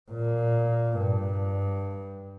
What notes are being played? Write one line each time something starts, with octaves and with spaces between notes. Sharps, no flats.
A#2
G2